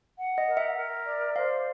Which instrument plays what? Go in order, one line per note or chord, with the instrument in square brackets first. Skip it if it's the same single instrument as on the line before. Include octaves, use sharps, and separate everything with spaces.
[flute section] F#5
[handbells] D#5
[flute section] A#4
[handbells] E5
[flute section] A#4
D5
[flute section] C5 [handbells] F5